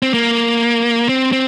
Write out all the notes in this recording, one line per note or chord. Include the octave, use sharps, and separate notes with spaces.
C4
A#3
C4
C4